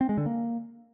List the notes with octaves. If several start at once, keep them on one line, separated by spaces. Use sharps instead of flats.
C4
G#3
D3
A#3